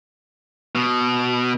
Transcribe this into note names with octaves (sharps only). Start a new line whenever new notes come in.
B2